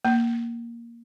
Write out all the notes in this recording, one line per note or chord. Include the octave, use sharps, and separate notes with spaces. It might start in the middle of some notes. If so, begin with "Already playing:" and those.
A#3